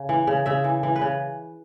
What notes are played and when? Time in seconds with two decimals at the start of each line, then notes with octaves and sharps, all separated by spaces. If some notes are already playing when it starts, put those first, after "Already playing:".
Already playing: C#3
0.09 E3
0.27 C#3
0.46 C#3 E5
0.64 E3
0.83 E3
0.96 B4
1.01 C#3